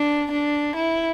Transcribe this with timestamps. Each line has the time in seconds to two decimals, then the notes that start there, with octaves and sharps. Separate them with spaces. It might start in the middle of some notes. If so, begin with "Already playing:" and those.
Already playing: D4
0.31 D4
0.76 E4